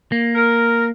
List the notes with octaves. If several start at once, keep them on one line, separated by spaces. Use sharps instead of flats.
A#3
A#4